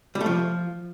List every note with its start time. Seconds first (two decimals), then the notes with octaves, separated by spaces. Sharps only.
0.15 G3
0.21 A3
0.26 F3